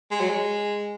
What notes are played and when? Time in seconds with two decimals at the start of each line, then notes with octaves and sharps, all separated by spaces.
0.11 G#3
0.20 F#3
0.30 G#3